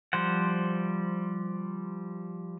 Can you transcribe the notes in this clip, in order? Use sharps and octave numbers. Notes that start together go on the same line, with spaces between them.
F3 G3 C5 F#5